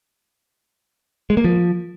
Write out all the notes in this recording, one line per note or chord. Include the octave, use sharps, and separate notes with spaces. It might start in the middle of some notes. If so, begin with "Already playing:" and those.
G#3
A#3
F3